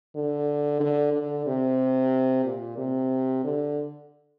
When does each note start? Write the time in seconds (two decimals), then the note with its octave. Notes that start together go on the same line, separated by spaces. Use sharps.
0.16 D3
0.80 D3
1.13 D3
1.47 C3
2.45 A#2
2.78 C3
3.44 D3